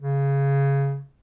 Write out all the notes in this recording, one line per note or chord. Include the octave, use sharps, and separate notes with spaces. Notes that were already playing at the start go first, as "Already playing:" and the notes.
C#3